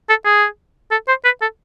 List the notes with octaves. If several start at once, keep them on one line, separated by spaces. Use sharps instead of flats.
A4
G#4
A4
C5
B4
A4